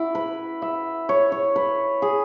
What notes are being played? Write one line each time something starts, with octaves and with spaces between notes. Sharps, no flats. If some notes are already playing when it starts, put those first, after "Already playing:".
Already playing: E4 F#4
B4
E5
C#5
C#5
B4
G#4